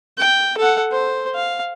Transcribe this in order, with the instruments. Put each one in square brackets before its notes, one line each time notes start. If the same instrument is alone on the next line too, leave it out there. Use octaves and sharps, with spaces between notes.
[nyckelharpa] G5
A4 F#5
C5
F5